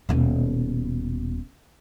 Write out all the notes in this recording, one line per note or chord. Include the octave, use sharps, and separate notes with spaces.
D#1 B2